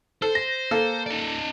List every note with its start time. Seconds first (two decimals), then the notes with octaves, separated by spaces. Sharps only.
0.22 A4 C5
0.35 A#6
0.71 A#3 A4
1.06 D#4 D5